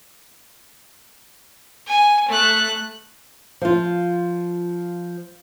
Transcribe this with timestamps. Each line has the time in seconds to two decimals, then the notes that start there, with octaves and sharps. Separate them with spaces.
1.87 G#5
2.28 A3 F#6
3.61 F3 F4